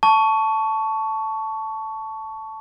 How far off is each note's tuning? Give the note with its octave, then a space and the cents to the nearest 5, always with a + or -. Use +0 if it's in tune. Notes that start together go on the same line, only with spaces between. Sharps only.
A5 +0 C#6 +15